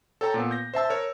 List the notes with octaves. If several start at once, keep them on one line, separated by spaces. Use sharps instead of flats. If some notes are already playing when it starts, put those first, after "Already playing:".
A4 C#5 G5 A5 A#5
A#2 B3
G6 A#6
C5 E5 A5 E6
A#4 C#5